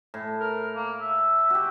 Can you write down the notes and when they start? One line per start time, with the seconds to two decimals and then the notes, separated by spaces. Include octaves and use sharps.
0.14 A2
0.40 A#4
0.76 A#3
1.00 E5
1.50 F#4 G4